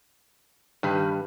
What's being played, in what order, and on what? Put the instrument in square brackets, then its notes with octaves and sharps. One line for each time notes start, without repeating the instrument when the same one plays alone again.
[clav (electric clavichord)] G2 [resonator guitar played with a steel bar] D#3 B4